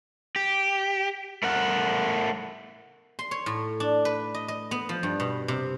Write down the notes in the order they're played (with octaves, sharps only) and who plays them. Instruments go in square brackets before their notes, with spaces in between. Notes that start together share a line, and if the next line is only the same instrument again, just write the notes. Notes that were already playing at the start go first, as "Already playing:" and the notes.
[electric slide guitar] G4
A3 A#4 F#5
[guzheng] C6
C#5
A2
D4
B4
D#5
D#5
B3
F3
G2
B2
C3